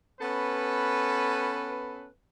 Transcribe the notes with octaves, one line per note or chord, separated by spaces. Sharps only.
B3 C#4 A4 B4